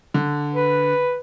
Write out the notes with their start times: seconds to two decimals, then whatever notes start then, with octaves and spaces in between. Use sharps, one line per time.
0.14 D3
0.53 B4